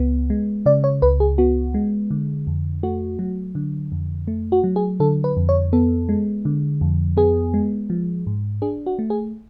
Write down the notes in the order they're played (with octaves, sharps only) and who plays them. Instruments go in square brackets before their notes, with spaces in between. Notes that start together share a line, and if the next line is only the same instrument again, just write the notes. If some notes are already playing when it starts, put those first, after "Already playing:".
Already playing: [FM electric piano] C#2 B3
G#3
C#3 D5
C#5
C#2 B4
G#4
B3 F#4
G#3
D3
F2
A3 F#4
F#3
D3
F2
A3
F#4
F#3
G#4
D3 A4
B4
F2
C#5
B3 A4
G#3
D3
F2
B3 G#4
G#3
F3
G#2
D4 G#4
F#4
A3
G#4